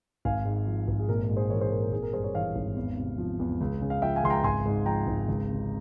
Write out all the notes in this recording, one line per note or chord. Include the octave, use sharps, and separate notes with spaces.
G#1 F5 G#5
G#2
F3
G#1
G#4
A#1 A#4
A#4
G#2
G#4 C5
E3 A#4 C#5
G#4 C5
A#1 A#4
A#4
G#1 G#4
A#4
G2 G#4 C5
A#4 C#5
E3 C#5 F5
G#1
E2
C3
F3
E2
C#2
C#3
F5
F3 E5 G5
F5 G#5
C#2 C6
G5 A#5
G#1 G#5 C6
G#2
F3 G5 A#5
G#1
C#2
C3